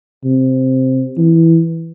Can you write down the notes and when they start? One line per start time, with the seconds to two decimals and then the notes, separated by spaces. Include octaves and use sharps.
0.24 C3
1.17 E3